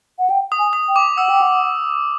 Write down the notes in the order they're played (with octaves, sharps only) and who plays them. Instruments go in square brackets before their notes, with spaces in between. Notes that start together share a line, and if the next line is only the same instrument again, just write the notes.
[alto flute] F#5
G5
[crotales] D#6
[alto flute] G#5
[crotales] D#6
[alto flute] G5
[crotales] D6
[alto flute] F#5 [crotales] E6
[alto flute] G5
F#5